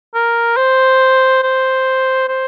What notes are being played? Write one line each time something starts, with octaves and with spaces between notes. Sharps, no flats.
A#4
C5
C5
C5